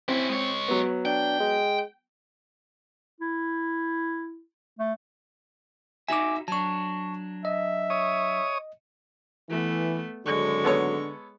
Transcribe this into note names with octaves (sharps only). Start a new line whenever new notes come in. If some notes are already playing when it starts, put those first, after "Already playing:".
C4 C#4 E4
G#3 C#5
F#3 B3
D4 G5
G#3
E4
A3
D#4 F#4 E5 G#5 D6
F#3 D4 A5 C#6
D#5 E5
C#5 D#6
E3 A3 B3
G#1 D3 F#3 G#3 C#6
B3 A4 C#5